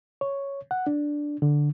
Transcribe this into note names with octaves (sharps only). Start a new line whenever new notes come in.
C#5
F#5
D4
D3